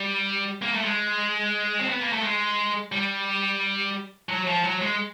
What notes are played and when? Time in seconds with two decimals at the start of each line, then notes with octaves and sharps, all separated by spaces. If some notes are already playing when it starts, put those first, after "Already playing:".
Already playing: G3
0.62 A#3
0.74 A3
0.85 G#3
1.79 C4
1.90 B3
2.01 A#3
2.12 A3
2.23 G#3
2.92 G3
4.29 F#3
4.47 F3
4.64 F#3
4.81 G#3